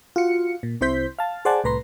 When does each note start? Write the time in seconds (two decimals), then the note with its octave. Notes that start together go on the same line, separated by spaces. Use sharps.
0.16 F4 F#4 C#7
0.63 A#2
0.81 C2 C3 E4 C5 G6 B6
1.19 F5 A5
1.45 G#4 C5 D5 F#5 G#5 A5
1.64 C2 A2 B4 A#5 C6